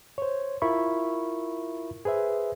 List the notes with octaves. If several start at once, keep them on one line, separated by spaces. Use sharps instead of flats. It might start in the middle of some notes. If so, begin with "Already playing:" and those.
C5 C#5
E4 F4 A#4 E5 B5 C#6
G#4 B4 C5 E5